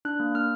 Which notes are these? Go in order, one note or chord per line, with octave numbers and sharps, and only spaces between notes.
D4 F#6
A#3
A#3 F6